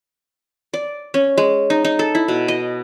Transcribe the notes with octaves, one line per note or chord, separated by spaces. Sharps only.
D5
C#4
G#3
D#4
D#4
A4
E4
B2
D#5